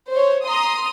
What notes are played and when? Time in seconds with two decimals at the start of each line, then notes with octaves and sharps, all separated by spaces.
0.12 C5 C#5
0.45 A#5 C6 D#6